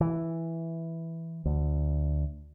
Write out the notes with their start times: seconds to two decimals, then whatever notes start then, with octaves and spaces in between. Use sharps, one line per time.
0.01 E3
1.45 D2